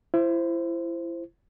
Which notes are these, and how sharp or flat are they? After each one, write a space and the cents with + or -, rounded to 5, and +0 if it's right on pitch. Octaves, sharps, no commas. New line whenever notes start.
E4 +30 C5 +0